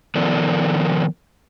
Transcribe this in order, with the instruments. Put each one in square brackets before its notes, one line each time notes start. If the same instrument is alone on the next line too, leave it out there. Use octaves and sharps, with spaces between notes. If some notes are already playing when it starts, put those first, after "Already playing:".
[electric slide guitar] D#3 F3 B3 A4 A#4 D5